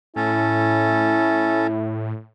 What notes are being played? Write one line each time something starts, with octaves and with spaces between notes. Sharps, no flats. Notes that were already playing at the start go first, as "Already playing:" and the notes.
A2 C#4 E4 A4